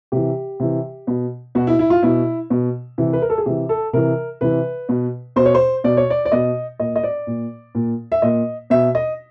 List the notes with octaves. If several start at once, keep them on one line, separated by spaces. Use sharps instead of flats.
C3 E3 G4
C3 E3
B2
B2 F#4
E4
E4
F4
B2 E4
B2
C3 E3
B4
A#4
A4
G#4
C3 E3 G4
A4
C3 E3 A#4
C3 E3 B4
B2
B2 C5
C#5
C5
B2 D5
C#5
D5
D5
B2 D#5
A#2 D#5
D#5
D5
A#2
A#2
E5
A#2 D#5
B2 E5
D#5